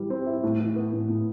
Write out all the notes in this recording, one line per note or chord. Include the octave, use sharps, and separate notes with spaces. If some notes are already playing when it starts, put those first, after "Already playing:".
Already playing: E3 G3
C4
E4
A2
E3
B3
A2
A2